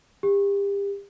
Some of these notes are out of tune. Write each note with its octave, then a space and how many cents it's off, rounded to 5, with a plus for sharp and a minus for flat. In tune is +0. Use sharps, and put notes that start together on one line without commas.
G4 +35